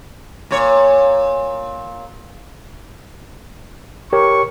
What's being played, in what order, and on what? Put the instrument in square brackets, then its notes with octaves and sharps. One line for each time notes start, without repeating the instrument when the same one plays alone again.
[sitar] A#2 C#5
[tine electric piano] G4 A#4 C#5 [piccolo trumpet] C#6